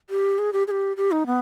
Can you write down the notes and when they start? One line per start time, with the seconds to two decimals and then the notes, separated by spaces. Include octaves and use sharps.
0.10 G4
0.39 G#4
0.53 G4
0.67 G#4
0.71 G4
0.97 G4
1.12 D#4
1.26 B3